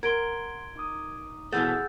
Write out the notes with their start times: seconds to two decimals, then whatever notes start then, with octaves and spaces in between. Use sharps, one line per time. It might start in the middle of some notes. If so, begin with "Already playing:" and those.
0.03 A#4 F#5 C6 G#6 D7 G7
0.76 D#4 D6 D#6
1.52 B2 E3 A3 G#4 F#5 E6 G6 A6